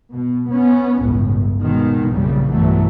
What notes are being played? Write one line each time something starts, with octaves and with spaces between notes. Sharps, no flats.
B2
B3 C#4
G1 C#2 A2
B2 D#3 G#3
A#1 F#2 C#3 G3
B1 G2 E3 F#3 A3